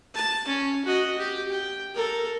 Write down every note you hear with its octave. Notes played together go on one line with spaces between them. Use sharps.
A5
C#4
F#4 D#5
G4
G5
A4 A#4